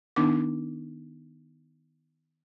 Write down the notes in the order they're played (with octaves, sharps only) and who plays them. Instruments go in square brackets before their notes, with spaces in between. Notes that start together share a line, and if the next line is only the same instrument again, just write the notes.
[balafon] D#3 B3 D4 D#4 D6